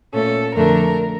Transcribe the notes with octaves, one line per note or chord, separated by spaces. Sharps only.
A#2 A3 C#4 A4
F2 D3 A3 D4 A#4